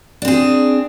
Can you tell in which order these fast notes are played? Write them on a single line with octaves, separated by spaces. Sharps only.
D4 C4 G#4